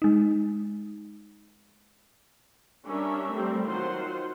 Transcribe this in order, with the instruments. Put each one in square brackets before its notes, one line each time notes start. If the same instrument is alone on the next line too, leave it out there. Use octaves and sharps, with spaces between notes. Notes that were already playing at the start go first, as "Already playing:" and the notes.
[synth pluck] G#3 D#4
[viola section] G3 C#4 D4 A#4 E5
G3 A3 C4
D#3 F#3 F4 C5 F#5 C6